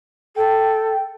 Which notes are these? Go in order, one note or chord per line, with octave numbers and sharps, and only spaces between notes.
A4 G5